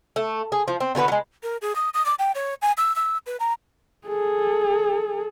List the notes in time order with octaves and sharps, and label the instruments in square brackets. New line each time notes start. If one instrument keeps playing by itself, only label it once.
[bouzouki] A3
G#4
F3
C4
D3 F#4 G#4 B4
F#3 G#3
[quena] A#4
G#4
D#6
D#6
D6
G5
C#5
G#5
E6
E6
B4
A#5
[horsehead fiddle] G#4 A4